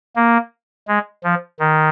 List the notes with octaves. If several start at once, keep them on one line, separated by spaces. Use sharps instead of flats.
A#3
G#3
F3
D#3